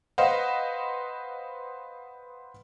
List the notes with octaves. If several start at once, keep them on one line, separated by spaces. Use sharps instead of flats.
B4 C5 D#5 F5 F#5